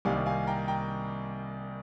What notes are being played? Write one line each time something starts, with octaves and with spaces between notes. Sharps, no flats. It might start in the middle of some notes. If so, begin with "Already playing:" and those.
C2 C3 D#3 G3 A#3 F5 G#5
F5 G#5
G5 A#5
G5 A#5